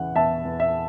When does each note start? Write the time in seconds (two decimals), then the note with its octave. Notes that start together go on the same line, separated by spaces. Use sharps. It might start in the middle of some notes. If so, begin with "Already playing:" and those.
Already playing: E2 C#3 E3 F#5
0.15 E2 E5 A5
0.45 E2
0.60 E5